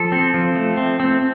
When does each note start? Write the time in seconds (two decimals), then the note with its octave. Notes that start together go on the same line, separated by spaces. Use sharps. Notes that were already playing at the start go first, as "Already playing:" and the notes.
Already playing: F3 A4
0.12 C4
0.34 F3
0.56 A3
0.77 C4
1.00 C4